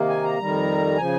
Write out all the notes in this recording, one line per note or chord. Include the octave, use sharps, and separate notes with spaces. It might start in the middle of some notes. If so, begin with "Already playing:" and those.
Already playing: C3 D#3 A#3
G#5
A#5
F2 D#3 G3
C#3 F3 G#5